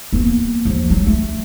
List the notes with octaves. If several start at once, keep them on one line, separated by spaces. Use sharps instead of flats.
A#3 B3
D#2 F3
F#3
A3